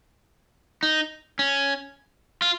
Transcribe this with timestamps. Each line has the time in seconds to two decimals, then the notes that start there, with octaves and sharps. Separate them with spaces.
0.83 D#4
1.39 C#4
2.42 F4